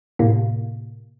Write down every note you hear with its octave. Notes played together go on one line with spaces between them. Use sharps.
A2 C3 A#3